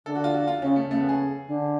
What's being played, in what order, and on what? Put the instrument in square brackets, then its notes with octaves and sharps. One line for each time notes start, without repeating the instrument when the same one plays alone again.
[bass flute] D3 [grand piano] A4
[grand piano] F#4
F4
F#4
F4
[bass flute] C#3 [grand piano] C#4
[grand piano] A3
[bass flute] C#3
[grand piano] A3
B3
G#4
[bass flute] D3